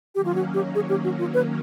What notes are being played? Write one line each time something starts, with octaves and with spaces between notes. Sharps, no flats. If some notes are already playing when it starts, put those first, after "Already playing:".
D#3 F#3 A#3 C#4 G4
F4
F#4
G4
G#4
G4
F#4
F4
B4